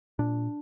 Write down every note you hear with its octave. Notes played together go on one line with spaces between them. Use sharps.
A#2 D4